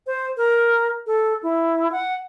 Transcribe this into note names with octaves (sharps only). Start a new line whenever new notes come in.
C5
A#4
A4
E4
F#5